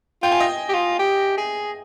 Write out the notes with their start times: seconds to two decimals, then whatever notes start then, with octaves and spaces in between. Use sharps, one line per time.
0.23 F4 G5
0.32 G#5
0.40 D#5 G5
0.69 G4
0.74 F4
0.99 G4
1.38 G#4